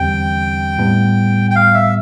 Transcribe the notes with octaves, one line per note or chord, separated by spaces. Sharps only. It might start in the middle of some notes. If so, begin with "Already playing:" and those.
Already playing: E2 D3 G3 C4 G4 G5
A2 G3 B3
G5
F5
E5